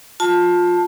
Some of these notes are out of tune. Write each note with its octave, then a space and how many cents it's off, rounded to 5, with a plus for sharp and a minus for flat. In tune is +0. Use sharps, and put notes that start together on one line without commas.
F4 +20 A5 +5